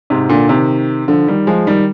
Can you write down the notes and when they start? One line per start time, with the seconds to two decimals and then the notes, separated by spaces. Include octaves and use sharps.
0.10 G#2 C3
0.29 A#2 D3
0.49 C3 D#3
1.08 D3 F3
1.27 D#3 G3
1.47 F3 G#3
1.67 D#3 G3